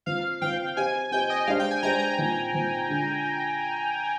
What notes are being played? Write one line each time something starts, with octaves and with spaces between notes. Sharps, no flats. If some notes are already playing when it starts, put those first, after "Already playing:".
F3 C4 F4 F5
F3 C4 F4 G5
C4 G4 C5 D#5 G#5
C4 G4 C5 D#5 G5
D#5
G#3 D4 G4 C5 F5
G5
G#5
G#3 D4 G4 C5 A#5
A#5
A#2 F3 C4 D#4
A#2 F3 C4 D#4
D3 G#3 D4 F4